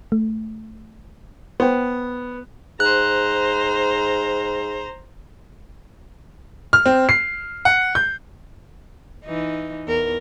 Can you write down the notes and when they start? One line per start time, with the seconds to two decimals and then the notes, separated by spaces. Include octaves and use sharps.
0.12 A3
1.60 B3 B4 C5 G5
2.80 G#2 C5 A#5 F#6
6.73 F6
6.86 C4
7.09 C7
7.65 F#5
7.95 G6
9.25 E3 D#4
9.86 E2 A#4